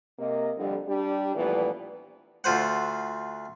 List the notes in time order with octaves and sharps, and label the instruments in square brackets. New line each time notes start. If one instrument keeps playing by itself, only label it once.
[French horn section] C3 A#3 D#5
F2 D3 G3
G3 D4 G4
A#2 E3 F3 G3 A3 B3
[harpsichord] D2 F4 C5 F#5